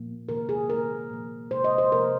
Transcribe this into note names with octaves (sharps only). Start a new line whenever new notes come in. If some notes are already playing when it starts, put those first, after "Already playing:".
Already playing: A#2 F3 A#3
C3 D#3 A#3 A#4
G#4
D#3 A#3 A#4
A#2 F3 A#3
C3 G#3 C5
D#5
C5
C3 F3 A#3 A#4